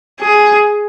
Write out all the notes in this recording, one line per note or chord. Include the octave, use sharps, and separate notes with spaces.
G#4